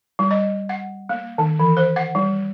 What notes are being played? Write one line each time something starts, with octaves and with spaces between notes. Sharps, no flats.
G3
D#5
F#5
A#3
D#3
E3
C5
F#5
G3